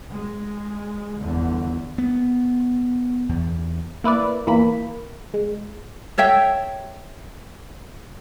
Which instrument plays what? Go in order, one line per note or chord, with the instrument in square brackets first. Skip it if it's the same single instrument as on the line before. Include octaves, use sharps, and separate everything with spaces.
[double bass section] G#3
[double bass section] G1 D3 [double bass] E2
[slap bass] B3
E2
[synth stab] A#3 E4 B4 D5
E2 E3 A#3 B5
G#3
[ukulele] A4 C#5 E5 G5